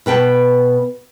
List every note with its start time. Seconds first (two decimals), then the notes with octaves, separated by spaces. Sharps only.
0.06 B2 B4 G5 A5